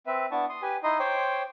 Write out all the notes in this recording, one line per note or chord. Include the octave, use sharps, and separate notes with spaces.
C4 B4 E5
B3 D4 E4 A5 C#6
C6 D#6
G4 B4 G#5
D#4 E4 D#5 C6 D#6
C5 C#5 G5 C6 D6